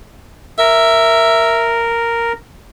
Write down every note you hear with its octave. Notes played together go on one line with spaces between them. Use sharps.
A#4 E5